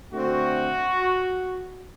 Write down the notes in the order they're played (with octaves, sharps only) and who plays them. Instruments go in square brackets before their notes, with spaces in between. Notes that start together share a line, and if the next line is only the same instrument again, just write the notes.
[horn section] D3 A3 C4 F#4